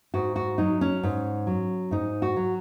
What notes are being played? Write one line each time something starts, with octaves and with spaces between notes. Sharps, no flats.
G#2 F#4
F#4
F#3 D#4
C#4
G#2
F#3
G#2 D#4
F#4
F#3